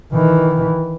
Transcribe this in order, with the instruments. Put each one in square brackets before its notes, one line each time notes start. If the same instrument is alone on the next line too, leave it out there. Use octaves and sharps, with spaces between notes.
[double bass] D#3 E3